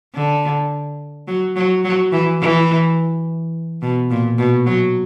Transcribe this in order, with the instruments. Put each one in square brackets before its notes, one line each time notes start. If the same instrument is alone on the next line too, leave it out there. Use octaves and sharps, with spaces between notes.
[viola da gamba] D3
F#3
F#3
F#3
E3
E3
B2
A#2
B2
F#3